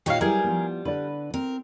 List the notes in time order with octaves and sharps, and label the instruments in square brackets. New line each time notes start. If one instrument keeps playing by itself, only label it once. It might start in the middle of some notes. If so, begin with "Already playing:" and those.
[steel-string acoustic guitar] A#2 D#4 F#4 [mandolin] G4 C#5 F5
[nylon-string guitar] F#3 E4 B4 [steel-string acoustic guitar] G3 [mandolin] G#4 A#4
[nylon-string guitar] F3 B3
[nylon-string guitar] D3 D5 [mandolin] B4
[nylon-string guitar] C4 [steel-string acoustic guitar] A#4